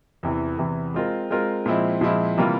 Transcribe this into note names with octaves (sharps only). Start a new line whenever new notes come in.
E2 C3 E3
E2 C3 E3
G#3 C4 F4 A#4
G#3 C4 F4 A#4
A#2 F3 G#3 C4 E4
A#2 F3 G#3 C4 E4
C3 E3 G3 A#3 F4